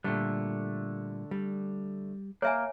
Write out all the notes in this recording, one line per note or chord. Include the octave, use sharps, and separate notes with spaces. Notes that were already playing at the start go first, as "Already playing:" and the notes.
A#2 D3 G3 A3
G3
A#3 C#5 E5 G#5